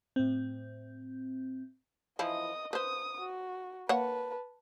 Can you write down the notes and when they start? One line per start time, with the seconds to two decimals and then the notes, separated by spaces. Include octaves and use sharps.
0.16 A2 C4
2.19 E3 F3 E4 D#5 D#6
2.73 B4 C5 D#6
3.19 F#4
3.89 A#3 B4 C#5 F#5 A5